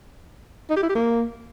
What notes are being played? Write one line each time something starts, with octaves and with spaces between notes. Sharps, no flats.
D#4
G4
E4
G4
A#3